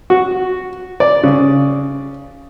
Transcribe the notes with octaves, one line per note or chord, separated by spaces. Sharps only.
F#4
D5
C#3